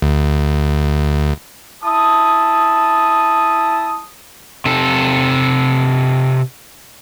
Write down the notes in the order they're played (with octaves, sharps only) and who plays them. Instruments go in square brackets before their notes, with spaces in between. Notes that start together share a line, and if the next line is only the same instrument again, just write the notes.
[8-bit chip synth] D2
[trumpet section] E4 A5 D#6
[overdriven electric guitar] C3 A4